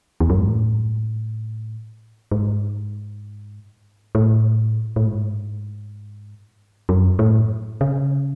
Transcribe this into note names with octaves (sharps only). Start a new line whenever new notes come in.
E2
F#2
G#2
A2
G#2
A2
A2
G#2
F#2
A2
C#3